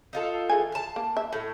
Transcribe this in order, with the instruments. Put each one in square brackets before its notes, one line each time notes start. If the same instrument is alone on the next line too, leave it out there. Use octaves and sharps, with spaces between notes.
[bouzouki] D#4 F4 A4
[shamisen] E3 G#4 G#5
[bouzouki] F5 A5
[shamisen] A#3
E5
[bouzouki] A2 [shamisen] A4